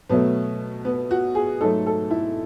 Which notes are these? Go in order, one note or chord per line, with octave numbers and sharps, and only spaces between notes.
B2 F#3 A3 B3
B3
F#4
G#4
G#2 F#3 A3 A4
A4
E4